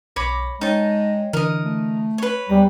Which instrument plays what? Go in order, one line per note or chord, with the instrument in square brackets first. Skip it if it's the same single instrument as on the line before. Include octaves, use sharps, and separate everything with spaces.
[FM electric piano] B1 A#6 [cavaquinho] C#5 B5 D6
[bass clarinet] G#3 [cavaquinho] D#4 A5 [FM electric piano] C#5 G5
[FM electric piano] D3 E3 [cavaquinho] A#4 D#5
[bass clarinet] A3
[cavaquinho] B4 C#5
[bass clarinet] E2 [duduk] G3 [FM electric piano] G#5 A#5